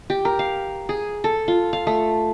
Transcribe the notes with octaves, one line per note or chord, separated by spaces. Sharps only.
G4
A#4
F5
G#4
A4
F4
F5
A3